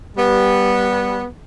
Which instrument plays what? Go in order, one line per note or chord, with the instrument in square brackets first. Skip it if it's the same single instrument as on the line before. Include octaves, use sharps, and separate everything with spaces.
[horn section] G3 B3